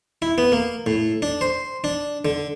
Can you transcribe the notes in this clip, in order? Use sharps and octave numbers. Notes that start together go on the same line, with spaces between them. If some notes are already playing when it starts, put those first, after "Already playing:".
E4
B3
A#3
A2
D4
C5
D4
D3